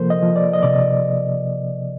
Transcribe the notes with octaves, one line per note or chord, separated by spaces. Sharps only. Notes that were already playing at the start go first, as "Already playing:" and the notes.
Already playing: C3 F3 A#3 A4 A#4 C5
D#5
F3
D5
D#5
C3 D5